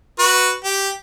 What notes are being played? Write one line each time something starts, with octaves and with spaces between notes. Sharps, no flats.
F#4 B4 C#6
G4